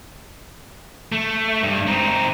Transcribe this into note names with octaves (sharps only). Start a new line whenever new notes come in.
A3
G2
C4 D#4